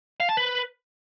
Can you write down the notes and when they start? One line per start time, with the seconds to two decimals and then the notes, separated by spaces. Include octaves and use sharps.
0.20 F5
0.29 A5
0.37 B4